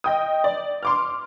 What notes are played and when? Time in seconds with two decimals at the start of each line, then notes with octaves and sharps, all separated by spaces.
0.04 D#5 G5 D#6
0.44 D5
0.83 C6 D6 F6